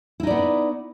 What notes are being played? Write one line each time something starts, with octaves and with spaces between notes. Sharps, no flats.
B3 D#4 E4 D5